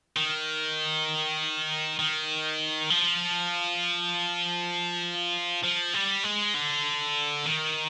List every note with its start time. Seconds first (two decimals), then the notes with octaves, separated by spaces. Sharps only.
0.16 D#3
1.99 D#3
2.90 F3
5.64 F3
5.94 G3
6.24 G#3
6.54 D3
7.46 D#3